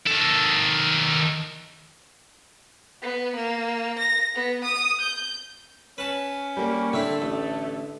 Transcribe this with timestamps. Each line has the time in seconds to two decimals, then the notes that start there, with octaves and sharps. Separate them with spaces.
0.07 D#3 A4
3.02 B3
3.36 A#3
3.99 A#6
4.35 B3
4.64 D#6
5.01 G6
5.98 C#4 B4 A5
6.57 G3 A#3
6.93 D3 A3 C4 E4
7.22 A1